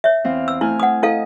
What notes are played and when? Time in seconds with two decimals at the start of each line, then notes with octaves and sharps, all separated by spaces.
0.04 C#5 E5
0.24 E2 C4 F5
0.48 E6
0.61 A3 E4 G#5 F6
0.80 F#5 D#6
1.03 E4 A4 D#5 F5